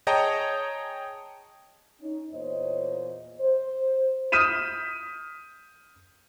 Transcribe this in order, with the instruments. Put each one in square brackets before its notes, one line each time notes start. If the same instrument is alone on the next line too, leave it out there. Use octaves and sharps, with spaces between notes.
[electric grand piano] G#4 C#5 D#5 G5 A5 A#5
[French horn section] C#4 D#4
E2 A#2 A#3 C5 C#5 D#5
C5
[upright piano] D#6 F6 G6 B6 D#7 E7